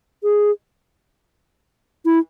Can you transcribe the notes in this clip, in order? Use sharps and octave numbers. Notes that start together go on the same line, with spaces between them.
G#4
E4